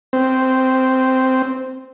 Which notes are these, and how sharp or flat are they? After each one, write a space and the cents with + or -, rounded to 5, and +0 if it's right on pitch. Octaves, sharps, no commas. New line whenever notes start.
C4 -5